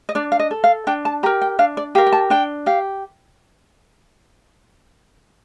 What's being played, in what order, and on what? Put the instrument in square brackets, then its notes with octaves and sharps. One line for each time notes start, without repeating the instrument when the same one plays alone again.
[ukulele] D#5
D4 D5
F5
D#5
A4
F5
D4 G5
A5
G4 A#5
A#4
G5
D4 F5
D5
G4 F5
A#4
G5
A5
D4 G5
G4 F5